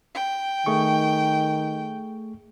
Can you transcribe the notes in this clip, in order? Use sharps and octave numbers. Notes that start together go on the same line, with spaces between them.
G5
D#3 A3 G#4 C#6